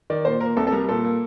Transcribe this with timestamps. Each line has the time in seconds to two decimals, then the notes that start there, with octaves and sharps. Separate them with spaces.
0.10 D#3 D5
0.25 A#2 C5
0.40 A#3 A#4
0.57 C2 A4
0.67 A4
0.72 G3 A#4
0.89 A#2 A4
1.05 A#3